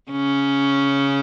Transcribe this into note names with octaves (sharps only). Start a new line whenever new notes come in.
C#3 C#4